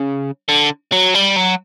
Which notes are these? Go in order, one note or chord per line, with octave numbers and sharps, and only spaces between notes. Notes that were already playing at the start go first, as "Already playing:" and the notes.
Already playing: C#3
D3
F#3
G3
F#3